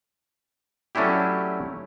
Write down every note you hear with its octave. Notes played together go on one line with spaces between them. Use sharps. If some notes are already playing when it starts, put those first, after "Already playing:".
F#3 A3 C#4 D4 E4 G4